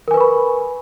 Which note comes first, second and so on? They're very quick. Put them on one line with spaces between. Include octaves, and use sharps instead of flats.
A#4 G#5 B4 C#6 B5